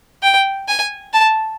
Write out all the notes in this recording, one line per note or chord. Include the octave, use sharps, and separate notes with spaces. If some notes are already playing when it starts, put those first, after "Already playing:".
G5
G#5
A5